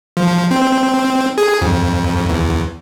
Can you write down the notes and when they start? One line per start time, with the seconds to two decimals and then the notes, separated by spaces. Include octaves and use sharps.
0.17 F3
0.51 C4
1.38 G#4
1.61 F2
2.29 E2